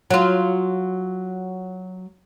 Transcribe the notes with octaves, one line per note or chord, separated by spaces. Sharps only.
F#3 F4